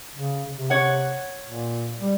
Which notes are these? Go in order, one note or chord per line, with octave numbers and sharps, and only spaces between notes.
C#3
C3
C#5 F#5
A#2
G3